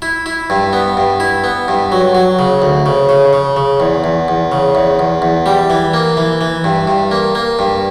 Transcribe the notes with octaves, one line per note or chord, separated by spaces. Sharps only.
E4
E4
G2
B3
G2
E4
B3
G2
F#3
F#3
C#3
D2
C#3
C#3
C#3
C#3
E2
E2
E2
C#3
E2
E2
E2
G3
E3
A#3
E3
E3
G2
G2
A#3
A#3
G2